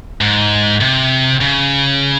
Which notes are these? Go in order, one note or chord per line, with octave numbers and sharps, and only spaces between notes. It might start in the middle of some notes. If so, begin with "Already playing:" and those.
G#2
C3
C#3